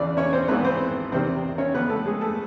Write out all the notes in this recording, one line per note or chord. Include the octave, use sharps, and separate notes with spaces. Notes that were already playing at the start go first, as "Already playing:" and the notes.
Already playing: E2 C#3 E3 D4 D5
C#4 C#5
C4 C5
G#1 G#2 E3 B3 B4
C4 C5
E2 C3 D#3 C4 C5
C#4 C#5
F2 D3 B3 B4
A3 A4
G#3 G#4
A3 A4